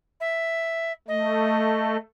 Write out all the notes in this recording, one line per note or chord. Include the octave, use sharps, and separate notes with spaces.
E5
A3 D#5